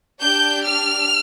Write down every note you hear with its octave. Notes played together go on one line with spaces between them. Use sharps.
D4 G4 G6
F6